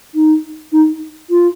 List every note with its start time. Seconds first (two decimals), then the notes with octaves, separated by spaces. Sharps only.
0.15 D#4
0.72 D#4
1.30 F4